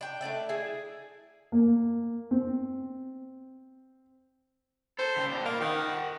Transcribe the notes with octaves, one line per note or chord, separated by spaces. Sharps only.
D4 G5
A3 D4 D5 E5
E4 G#4
A#3
C4
A4 C5
C#3 G3
B2 D4
A#3 F4
D#3 G4 F#5